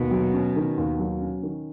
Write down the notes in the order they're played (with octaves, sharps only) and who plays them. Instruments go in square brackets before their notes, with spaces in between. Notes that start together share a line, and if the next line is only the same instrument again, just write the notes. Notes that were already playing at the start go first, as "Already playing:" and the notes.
Already playing: [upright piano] D#2 [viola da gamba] B2
[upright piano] F#3
C#4
D#3
D#2
F#3
C#4
D#3